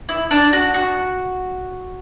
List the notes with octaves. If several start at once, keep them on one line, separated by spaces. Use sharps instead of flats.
E4
D4
F#4
F#4